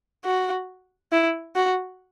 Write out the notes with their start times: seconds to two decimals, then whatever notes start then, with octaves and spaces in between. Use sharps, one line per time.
0.25 F#4
1.12 E4
1.56 F#4